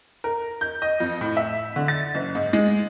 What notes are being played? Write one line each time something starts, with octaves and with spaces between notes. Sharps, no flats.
A#4
G6
D#5
F2
A2
E5
D3
A6
F#1
G#2
G#3